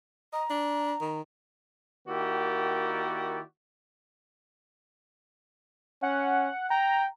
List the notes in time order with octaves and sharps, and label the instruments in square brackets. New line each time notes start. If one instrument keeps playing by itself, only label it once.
[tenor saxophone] D#5 [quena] A#5
[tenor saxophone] D4
D#3
[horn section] D#3 A#3 E4 F#4 G4 D5
[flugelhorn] C#4 [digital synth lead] F#5
[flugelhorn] G5 [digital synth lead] A#5